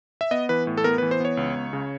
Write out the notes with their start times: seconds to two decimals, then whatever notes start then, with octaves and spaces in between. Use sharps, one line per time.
0.21 E5
0.31 B3 D#5
0.49 E3 B4
0.67 A2
0.77 A4
0.84 B3 A#4
0.98 E3 B4
1.11 C5
1.20 B3 C#5
1.37 C#2
1.55 C#2
1.73 C#3